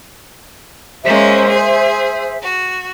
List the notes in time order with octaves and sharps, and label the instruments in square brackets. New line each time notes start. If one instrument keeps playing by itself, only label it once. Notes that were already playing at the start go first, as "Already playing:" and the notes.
[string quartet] G#3 A#3 C#4 [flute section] C5 E5
[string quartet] G#4
F#4